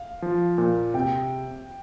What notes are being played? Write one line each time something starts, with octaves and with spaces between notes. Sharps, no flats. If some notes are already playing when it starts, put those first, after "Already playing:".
Already playing: F5
F3
A#2
C3 G5